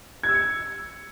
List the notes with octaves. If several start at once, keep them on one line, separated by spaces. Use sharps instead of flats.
G#6
E6
C#7